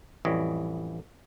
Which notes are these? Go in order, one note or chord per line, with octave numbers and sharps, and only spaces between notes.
A1 F2 E3 G3 C#5 D#5